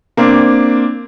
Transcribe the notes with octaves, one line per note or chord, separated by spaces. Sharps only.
A#3 C4 D4